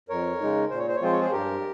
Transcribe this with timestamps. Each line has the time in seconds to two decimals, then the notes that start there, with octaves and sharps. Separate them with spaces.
0.09 F2 A#4 C#5
0.41 C#3 G#3 D#4
0.70 A#2 C5
0.79 C#5
0.88 C5
0.96 C#5
1.02 F3 G#3 C4 F4 C5
1.12 C#5
1.21 G#4 C5
1.32 G2 G4 A#4